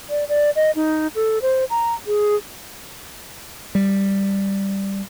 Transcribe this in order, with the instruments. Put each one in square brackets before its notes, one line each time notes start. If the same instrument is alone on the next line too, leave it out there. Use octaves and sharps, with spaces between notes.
[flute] D5
D5
D#5
D#4
A4
C5
A#5
G#4
[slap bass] G3